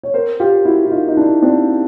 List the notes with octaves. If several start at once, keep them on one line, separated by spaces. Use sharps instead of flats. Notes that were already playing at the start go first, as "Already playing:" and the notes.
C#5
A#4 C5
F4 G4
E4 F#4
E4
D#4 F4
D#4
D4 E4
C4 D4